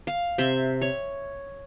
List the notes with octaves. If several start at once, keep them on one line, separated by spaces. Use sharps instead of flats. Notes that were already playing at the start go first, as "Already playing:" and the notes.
F5
C3 E5 C6
C#5